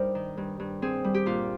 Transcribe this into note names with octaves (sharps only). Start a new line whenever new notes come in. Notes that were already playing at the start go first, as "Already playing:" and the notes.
Already playing: G2 G3 D#4 A#4 C5
D#3
G2
G2
C4 G#4
G3
G4
A#2 F4